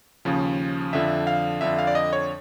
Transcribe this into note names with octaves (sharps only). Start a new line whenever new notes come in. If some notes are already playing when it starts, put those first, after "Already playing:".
D#2 C#3 F3
F2 D3 F3 E5
F5
F2 D3 F3 E5
F5
D5
D#5
C#5